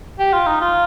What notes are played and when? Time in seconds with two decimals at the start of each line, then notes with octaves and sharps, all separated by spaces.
0.19 G4
0.33 F4
0.47 D#4
0.61 F4